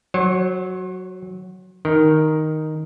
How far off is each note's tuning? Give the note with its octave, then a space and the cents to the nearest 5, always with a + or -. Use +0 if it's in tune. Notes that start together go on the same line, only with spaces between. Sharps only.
F#3 +0 C5 +45
D#3 +0 A#4 +0